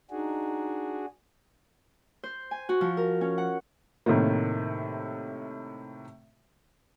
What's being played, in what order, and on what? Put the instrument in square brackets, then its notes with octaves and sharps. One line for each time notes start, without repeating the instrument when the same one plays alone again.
[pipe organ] D4 F#4 G#4 [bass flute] D#4
[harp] C5
G#5
F#4
F3
A#4
C#4
F#5
[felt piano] A2 C3 D#3 A#3